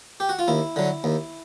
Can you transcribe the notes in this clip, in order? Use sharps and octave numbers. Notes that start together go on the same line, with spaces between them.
G4
F#4
F4
D#2 E4
D3 F#3
D#2